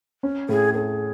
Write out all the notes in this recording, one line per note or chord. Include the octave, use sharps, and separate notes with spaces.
C#4
A2 G#4
A3 G#4